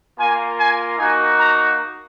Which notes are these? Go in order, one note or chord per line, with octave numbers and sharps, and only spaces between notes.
A#3 F4 G#5
G#5
A#3 D#4 F#4 G#5
A#5